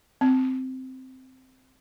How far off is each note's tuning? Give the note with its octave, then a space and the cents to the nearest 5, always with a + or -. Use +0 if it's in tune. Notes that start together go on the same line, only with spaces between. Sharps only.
C4 -10